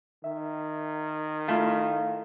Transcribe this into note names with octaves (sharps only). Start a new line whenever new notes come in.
D#3 E5
A3 E4 F4 F5